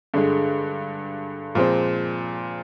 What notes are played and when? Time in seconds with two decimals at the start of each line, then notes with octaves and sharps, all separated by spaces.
0.14 G2 D3 G#3
1.55 A#2 F3 G#3 C4